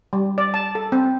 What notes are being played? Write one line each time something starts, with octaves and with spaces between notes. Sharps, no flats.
G3
D5
A5
A4
C4